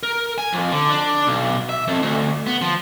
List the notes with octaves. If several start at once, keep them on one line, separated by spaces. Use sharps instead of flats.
A#4
G#5
F2
D3
D4
B1
E5
F2
D2
B3
F3